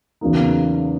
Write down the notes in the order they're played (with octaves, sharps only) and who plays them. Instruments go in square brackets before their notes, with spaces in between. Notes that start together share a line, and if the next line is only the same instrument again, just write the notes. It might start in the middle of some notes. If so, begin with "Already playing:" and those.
[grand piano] E2 C#3 F#3 A#3 D#4